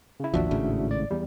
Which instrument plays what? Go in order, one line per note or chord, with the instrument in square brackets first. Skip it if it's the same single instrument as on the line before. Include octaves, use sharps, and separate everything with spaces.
[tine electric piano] C#3 E4
[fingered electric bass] A1 D#2 F3 [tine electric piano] D4 F#4 E5
[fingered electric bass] G#1 A2 C#3
[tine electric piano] D5
E2 G3